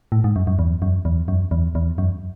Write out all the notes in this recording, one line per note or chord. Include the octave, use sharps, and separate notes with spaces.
A2
G#2
F#2
F#2
E2
F#2
E2
F#2
E2
E2
F#2